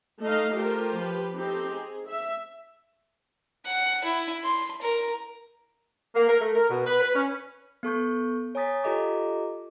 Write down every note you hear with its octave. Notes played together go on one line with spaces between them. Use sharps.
A3 D#4 D#5 F5
A3 F4 G4 A#4 C5
F3 G4 B4
C4 D#4 G4 A4
G#4
E5
F#5
E4
C6
A#4
A#3
A#4
A3
A#4
B2
B4
B4
C#4
B3 A4 C#6 G6
C#5 G#5 A#5 D#6 A6 B6
F4 G4 A4 D#5 A#5 D6